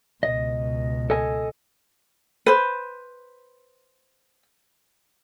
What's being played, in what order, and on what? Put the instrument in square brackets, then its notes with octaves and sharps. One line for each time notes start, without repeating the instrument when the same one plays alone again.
[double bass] C#2 B2 [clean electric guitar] D#5
[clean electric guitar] A4 D#5 G#5
[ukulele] B4 C5